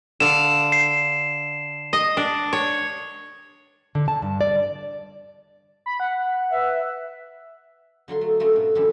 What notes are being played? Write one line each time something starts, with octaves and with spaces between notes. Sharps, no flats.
D3 F5 E7
C7
D#5
D4
C#5
D3
A5
G2
D5
B5
F#5
B4 E5
D3 F#3 F4 C6
A3
G#3 A3 C#4 F4 A#4
G#2 B2
F#2 B2 D3 E3 G4 A4